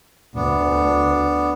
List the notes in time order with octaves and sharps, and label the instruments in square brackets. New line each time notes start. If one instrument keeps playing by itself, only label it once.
[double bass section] D2 [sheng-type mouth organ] B3 D4